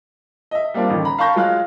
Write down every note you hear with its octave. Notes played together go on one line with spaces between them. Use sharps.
D#5 E5
G3 A#3 C4 D4 F4
A1 D3 D#3
A#5 B5
F5 A5 B5 C#6 G6 A#6
F#3 G#3 F4 F5 F6 F#6